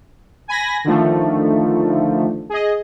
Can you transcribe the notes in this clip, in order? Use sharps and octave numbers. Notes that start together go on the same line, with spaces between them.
G#5 B5 A#6
D3 D#3 F3 A3
G#4 D#5